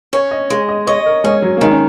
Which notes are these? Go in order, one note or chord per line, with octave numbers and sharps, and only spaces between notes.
C#4 C#5
D#5
G#3
D#5
C#5 D#5
A#4
G#3 C#4
F#3
A#3
D#3 G#3
C#4